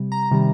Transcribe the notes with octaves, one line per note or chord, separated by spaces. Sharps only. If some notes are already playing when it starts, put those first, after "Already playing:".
Already playing: C3 G3
A#5
C3 D#3 G3